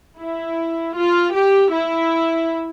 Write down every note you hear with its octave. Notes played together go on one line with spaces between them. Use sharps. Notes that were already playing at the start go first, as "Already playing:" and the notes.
E4
F4
G4
E4